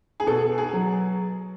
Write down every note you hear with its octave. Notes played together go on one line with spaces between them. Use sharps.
G#4
B2 A4
G#4
F#3